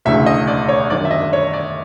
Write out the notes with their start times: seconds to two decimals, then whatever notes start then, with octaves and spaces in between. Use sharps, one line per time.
0.05 E1 D2 C#3 E3 E5
0.26 D#5
0.47 D5
0.69 C#5
0.90 G1 F#2 D#3 D5
1.05 E5
1.11 D#5
1.33 C#5
1.53 D5